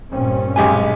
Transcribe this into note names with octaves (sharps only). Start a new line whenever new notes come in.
G2 A#2 C4 C#4
B1 G#3 G4 G#5